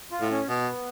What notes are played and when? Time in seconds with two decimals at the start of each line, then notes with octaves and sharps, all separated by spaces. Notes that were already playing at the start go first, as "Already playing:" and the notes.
0.11 F4
0.21 A2
0.31 C#4
0.49 B2 B3